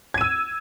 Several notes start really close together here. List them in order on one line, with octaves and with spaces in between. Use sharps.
G#6 D#7 E6